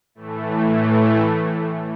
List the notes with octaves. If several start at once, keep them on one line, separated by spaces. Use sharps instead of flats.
A2 E3 A3
A3